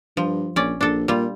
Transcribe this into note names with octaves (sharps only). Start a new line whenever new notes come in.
G2 F3
A#1 C#4 D5
A#1 D4 A4
A#2 G3 F4